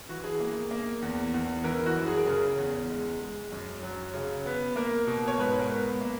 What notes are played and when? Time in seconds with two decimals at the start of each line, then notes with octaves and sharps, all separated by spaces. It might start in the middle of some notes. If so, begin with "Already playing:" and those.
0.09 E3 F#4
0.24 G#4
0.40 A#3
0.71 A#3
1.02 E2
1.34 E2
1.64 E3 A#4
1.86 F#4
1.96 F#2
2.06 G#4
2.18 A#4
2.27 C#3 G#4
2.58 E2
2.90 G#3
3.21 G#3
3.52 F#2
3.83 F#3
4.14 C#3
4.46 B3
4.76 A#3 A#4
5.07 B2
5.28 C#5
5.38 G#2 B4
5.59 A#4
5.70 B3
6.01 A#3